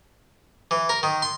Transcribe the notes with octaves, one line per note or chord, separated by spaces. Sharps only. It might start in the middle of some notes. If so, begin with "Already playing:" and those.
E3
A#4
D#3
C6